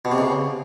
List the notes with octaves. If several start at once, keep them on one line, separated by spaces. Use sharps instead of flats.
B2
C3
C#3